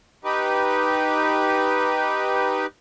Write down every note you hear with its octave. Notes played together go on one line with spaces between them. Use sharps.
D#4 G4 B4